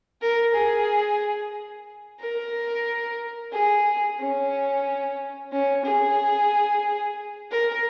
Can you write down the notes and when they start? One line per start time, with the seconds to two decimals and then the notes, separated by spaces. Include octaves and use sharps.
0.21 A#4
0.54 G#4
2.20 A#4
3.52 G#4
4.20 C#4
5.52 C#4
5.85 G#4
7.51 A#4